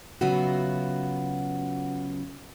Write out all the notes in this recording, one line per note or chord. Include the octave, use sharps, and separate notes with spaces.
C#3 F#3 B3 F4 F#4 E5